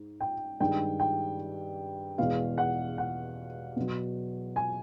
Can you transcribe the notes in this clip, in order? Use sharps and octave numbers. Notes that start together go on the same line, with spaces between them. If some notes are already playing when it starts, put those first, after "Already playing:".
Already playing: G#2
G5
G2 D#3 G#3 G5
G5
E2 B2 G#3 F5
F#5
F#5
B2 F#3
G#5